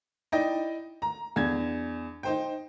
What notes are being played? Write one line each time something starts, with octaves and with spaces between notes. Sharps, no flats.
D#4 E4 D5 D#5 G5
A#5
E2 D4 G#6
D#4 C5 G5